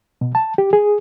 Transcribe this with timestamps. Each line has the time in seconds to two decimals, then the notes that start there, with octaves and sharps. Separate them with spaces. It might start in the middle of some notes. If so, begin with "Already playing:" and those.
0.21 B2
0.35 A5
0.58 G4
0.73 G#4